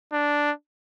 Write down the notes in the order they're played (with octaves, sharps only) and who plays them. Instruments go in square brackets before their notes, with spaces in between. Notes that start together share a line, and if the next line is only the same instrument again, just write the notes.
[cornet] D4